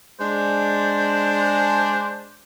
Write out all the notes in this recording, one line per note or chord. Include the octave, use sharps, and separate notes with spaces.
G#3 D4 C5